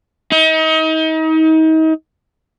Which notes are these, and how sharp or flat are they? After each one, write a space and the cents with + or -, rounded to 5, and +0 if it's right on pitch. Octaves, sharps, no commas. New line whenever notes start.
D#4 +35